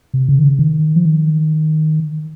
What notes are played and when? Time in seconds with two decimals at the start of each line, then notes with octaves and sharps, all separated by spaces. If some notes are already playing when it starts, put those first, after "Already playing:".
0.14 C3
0.29 C#3
0.39 D#3
0.44 C#3
0.59 D#3
0.96 F3
1.05 D#3